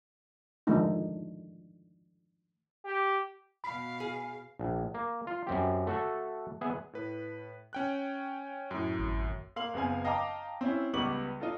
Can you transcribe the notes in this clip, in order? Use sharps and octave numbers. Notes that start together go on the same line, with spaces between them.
D#3 F3 G#3 A3 D4 D#4
G4
B2 F5 B5
G#4
A#1
A#3
F4
F#2 C4 G4
A3 F#4 A4
B3 G#4 B4 E5
A2 B4
C#4 G5 F#6
F#2 A2
G#1
A#3 F5 C6 F#7
F#1 B3 C4 F5 G#5
D#5 F5 G5 A5 A#5 D6
C4 C#4 E4
C#2 G3 B3 C#6 D6 F#7
D#4 F4 A4